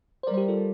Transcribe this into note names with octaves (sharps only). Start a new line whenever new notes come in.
C5
G3 A#4 D5
C5
G4 A#4
F4 A4